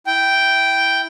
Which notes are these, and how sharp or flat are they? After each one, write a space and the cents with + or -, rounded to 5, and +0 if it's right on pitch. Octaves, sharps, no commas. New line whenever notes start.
E4 -5 G5 -5